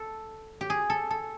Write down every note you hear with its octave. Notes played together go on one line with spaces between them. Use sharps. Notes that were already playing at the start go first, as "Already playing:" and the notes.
Already playing: A4
G4
G#4
A4
A4